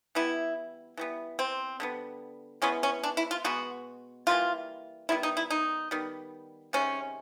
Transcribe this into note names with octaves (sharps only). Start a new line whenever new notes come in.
E3 G3 B3 E4
E3 G3 B3
C4
D3 G3 B3
E3 G#3 B3 C#4
C#4
D4
E4
F4
B2 G#3 B3 F#4
E3 G3 A#3 F4
D#3 G3 B3 E4
D#4
E4
D#4
D#3 G3 B3
C3 D#3 G#3 C#4